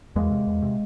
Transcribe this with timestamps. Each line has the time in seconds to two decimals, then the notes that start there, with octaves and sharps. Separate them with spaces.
0.16 E2 G#3 A#3
0.31 C3
0.47 E2
0.62 C3